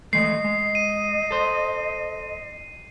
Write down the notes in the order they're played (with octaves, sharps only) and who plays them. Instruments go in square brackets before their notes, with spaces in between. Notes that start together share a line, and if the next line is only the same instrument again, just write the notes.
[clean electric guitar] E3 G#3 A3 [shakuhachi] D#5 [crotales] C7
[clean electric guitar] G#3
[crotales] D#7
[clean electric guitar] A4 C5